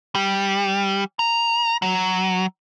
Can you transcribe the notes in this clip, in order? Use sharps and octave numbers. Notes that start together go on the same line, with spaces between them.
G3
A#5
F#3